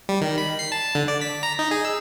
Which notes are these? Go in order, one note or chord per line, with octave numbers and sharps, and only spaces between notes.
G3
D#3
B5
C7
A5
D3
D5
B6
A#5
D#4
G#4
E6